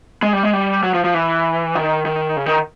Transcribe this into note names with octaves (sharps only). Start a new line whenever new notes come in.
G#3
G3
G#3
G3
F#3
F3
F3
E3
D#3
D#3
C#3
D#3